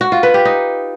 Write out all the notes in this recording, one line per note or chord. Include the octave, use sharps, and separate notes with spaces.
F#4
F4
B4
G4
D#4